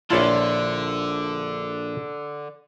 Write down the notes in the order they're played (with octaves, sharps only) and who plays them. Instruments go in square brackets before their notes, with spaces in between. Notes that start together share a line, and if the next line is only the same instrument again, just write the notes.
[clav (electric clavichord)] A#1 E4 A5 [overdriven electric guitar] D3 [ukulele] F4 C#5 D5